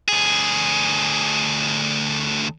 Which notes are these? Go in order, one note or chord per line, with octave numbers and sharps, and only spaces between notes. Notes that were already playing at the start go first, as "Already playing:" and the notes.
D2 G#4